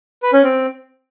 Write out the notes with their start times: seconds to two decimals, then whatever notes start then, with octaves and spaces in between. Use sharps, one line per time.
0.23 B4
0.33 C#4
0.43 C4